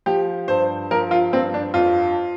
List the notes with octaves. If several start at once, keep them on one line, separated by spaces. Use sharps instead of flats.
F3 G4
G2 C5
F3 A#4
F4
G2 C4
D4
F2 F4